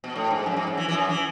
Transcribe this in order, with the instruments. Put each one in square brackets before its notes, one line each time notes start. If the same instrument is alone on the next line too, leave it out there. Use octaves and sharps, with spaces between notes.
[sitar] B2
A2
G#2
F#2
G#2
F#2
E3
E3
F#2
E3